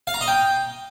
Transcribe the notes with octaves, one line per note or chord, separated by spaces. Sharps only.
F5
A#5
D#5
G5